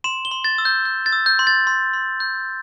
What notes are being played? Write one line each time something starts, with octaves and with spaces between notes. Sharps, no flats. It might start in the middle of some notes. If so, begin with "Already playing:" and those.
C6 E7
G7
C6
A6
E6
G6
G6
A6
E6
G6
C6
A6
C6
C6
G6